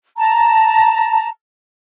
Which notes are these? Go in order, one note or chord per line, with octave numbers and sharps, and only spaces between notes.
A5 A#5